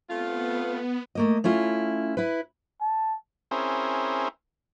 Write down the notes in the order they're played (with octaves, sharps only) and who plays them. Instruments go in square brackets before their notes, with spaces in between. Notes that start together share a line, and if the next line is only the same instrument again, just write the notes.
[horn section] A3 C4 F4 [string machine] B3
[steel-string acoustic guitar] A3 A#3 D#5
A3 C#4 E4 F4
E4 B4
[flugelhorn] A5
[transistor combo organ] C4 C#4 E4 G#4 A#4 C5